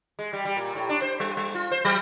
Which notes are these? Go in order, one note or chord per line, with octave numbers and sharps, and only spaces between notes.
G#3
G3
G3
A#2
A2
D4
C5
G3
G3
F4
C5
F#3